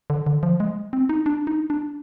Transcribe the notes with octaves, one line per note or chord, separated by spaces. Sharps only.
D3
D3
F3
G#3
C4
D#4
D4
D#4
D4